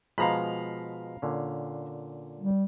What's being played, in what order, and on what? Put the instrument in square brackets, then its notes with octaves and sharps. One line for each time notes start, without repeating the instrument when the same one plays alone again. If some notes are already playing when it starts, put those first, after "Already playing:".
[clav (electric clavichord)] B2 F3 G#3 [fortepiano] F5 A#5 B5
[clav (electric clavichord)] A#2 D3 C#4
[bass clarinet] G3